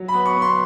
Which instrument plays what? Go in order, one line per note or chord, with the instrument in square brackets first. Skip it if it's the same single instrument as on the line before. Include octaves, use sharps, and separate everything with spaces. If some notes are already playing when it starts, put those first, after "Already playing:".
Already playing: [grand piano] F#3
B5
B3
C#6
B3
C6